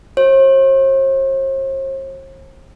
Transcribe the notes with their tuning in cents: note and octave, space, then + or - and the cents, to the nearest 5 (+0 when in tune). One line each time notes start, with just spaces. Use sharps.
F#4 +5 C5 +45